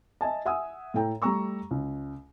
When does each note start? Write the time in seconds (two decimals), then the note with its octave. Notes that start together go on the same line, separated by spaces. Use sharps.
0.21 D#5 E5 G#5 A5
0.46 E5 F#5 G#5 D#6 E6
0.94 A2 A4 G5 A#5
1.22 G3 A3 A#5 C#6 E6
1.71 C#2